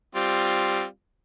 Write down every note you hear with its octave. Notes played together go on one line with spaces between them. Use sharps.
G3 C4 F4